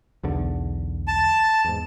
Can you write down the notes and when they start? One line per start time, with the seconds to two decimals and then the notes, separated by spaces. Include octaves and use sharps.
0.23 B1 E2 D3
1.08 A5
1.65 E2 G#2